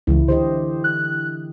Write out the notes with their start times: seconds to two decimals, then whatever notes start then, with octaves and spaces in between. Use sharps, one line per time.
0.07 C#2 E3 E4
0.28 D3 G4 C5 D#5
0.84 F#6